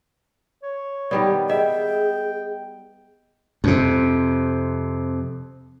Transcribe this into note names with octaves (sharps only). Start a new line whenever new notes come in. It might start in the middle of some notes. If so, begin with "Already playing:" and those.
C#5
D#3 G3 B3 D5
G#4 D#5 E5 G5
F2 C3